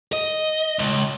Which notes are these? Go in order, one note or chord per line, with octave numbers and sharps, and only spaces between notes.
D#5
C#2